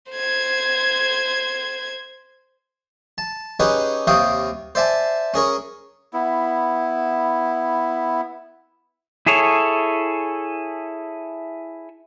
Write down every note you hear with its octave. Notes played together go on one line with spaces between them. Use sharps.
C5 G#6
A5
C#4 D#4 G4 G#4 B4 C#5
D#2 C3 C#5 F5 G5 D#6
C5 D5 E5 G#5 A5
C#4 G#4 A#4 C#5
B3 E4
E4 G#4 A4 C#5